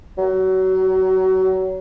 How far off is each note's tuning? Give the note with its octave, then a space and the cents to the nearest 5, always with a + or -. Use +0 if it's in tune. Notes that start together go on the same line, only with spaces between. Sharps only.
F#3 +25